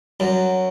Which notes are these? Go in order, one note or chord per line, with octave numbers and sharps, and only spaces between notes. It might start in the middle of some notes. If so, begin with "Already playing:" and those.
F#2 F#3